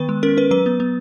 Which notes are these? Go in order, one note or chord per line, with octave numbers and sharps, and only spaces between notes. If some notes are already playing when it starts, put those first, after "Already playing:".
Already playing: D#3 B3 B4
G#3
C#4 A#4
C#4 B4
F#3 B4
B3
B3